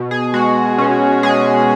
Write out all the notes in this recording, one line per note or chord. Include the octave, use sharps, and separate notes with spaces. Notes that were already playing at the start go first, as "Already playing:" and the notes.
Already playing: B2
G#4
G#3 F#4
B2 C#4
G#3 G#4